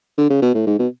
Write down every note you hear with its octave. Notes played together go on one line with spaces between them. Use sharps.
D3
C#3
B2
A2
G#2
B2